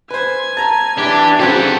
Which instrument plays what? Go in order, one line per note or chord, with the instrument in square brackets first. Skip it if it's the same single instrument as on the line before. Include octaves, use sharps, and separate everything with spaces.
[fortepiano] B4 C5 [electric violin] G#5 G#6
[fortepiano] A5 A#5
[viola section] E3 D4 [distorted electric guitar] G4
[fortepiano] C#3 F#3 C4 [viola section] F#4 [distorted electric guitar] G4 A4